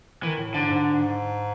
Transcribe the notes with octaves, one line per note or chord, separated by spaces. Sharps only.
D#3 E3
A2
G#2 D3
G#2